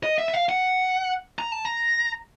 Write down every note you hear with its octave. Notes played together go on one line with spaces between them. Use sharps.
D#5
E5
E5
F5
F#5
A#5
A5
A#5